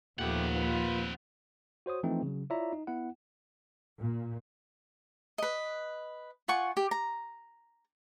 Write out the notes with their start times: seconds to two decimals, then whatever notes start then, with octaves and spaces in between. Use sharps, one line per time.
0.19 D#2 A#2 F3 A3 B3 C4 G4 F#5
0.55 F4 B4
1.86 F#4 C5 C#5 D#6
2.03 E3 F3 A3 C4 D#4
2.22 C#3 F#3
2.50 E4 F4 C#5 D5 E5 A#5
2.72 D#4
2.87 B3 E4 F#5
3.99 A#2
5.38 B4 D#5
6.48 F4 F#5 G#5 C#6
6.77 G4
6.91 A#5